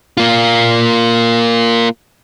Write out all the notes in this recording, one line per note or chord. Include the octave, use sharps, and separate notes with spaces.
A#3 F4